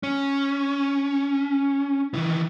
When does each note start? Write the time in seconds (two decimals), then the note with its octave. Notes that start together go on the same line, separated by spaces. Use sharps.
0.03 C#4
2.14 D#3 E3